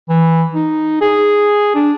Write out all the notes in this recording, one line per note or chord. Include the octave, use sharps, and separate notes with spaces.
E3
D#4
G#4
D4